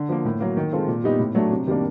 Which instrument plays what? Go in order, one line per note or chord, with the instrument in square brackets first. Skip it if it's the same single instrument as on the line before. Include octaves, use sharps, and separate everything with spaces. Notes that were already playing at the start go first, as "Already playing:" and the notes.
Already playing: [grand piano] D3
F3 A#3
A2
F#3 A#3
D#3
G#3 C4 F4 A4
A#2
G3 B3 D#4 G4
A2
F#3 A3 D4
C3
D#3 G3 A#3 D4